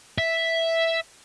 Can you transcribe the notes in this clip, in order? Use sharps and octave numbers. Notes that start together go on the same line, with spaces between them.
E5